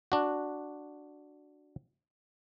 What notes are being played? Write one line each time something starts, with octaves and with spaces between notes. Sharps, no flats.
D4 F#4